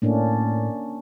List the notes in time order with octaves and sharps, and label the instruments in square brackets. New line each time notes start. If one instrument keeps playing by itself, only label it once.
[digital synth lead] A2 [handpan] A#3 C#4 D4